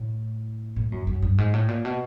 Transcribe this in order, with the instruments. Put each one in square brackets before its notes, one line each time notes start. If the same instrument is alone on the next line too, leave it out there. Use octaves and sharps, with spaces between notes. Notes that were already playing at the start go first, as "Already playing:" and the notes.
Already playing: [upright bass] A2
A2
F#2
F#2
G2
G#2
A2
A#2
B2